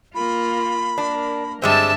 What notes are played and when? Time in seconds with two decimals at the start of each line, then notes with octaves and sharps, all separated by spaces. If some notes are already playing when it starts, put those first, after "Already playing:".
0.15 A#3 F4 B5
0.98 A#3 D4 A#4
1.62 G2 D3 G3 G#3 C4 E5 A5